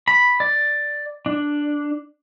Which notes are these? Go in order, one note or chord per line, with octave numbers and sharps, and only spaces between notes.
B5
D5
D4